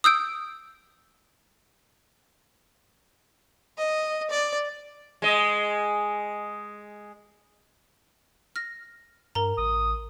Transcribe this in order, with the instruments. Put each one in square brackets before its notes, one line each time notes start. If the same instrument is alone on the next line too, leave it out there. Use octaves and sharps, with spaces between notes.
[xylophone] D#6 E6 G6 D7
[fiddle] D#5
D5
[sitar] G#3 D#5
[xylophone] F6 A#6
[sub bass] G2 [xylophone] A#4 A#5
[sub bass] A1 [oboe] D#6